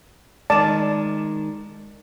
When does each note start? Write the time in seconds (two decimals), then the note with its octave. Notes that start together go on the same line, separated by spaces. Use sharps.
0.50 D#3 G#3 D5 A5